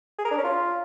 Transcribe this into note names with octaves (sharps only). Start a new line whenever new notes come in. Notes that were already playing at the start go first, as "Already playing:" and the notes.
G#4
A#4
D4
C#4
F4